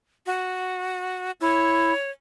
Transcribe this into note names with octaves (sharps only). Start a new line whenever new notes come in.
F#4
E4 C#5